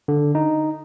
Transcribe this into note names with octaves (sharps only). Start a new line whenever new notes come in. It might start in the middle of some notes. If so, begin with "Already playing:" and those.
D3
D#4